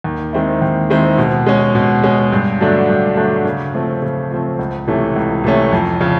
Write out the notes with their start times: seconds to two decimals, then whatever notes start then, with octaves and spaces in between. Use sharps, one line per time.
0.04 D#2
0.33 D#3 G#3 C4 E4
0.62 D#2
0.90 D#3 G#3 C4 E4
1.18 B2
1.46 G#3 C#4
1.75 B2
2.03 G#3 C#4
2.32 G2
2.60 D3 F#3 A3 D4
2.89 G2
3.17 D3 F#3 A3 D4
3.45 C#3
3.74 F3 A3 C4
4.02 C#3
4.31 F3 A3 C4
4.59 C#2
4.87 C3 E3 A3 C#4
5.16 C#2
5.44 C3 E3 A3 C#4
5.72 F2
6.01 C#3 F3